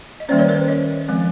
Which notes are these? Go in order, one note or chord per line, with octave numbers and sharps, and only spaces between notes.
D#5
D#3 G3 A#3 C#4 C5 D5
B4 C#5
A#4 C5
C#5 D#5
F3 G#3 C4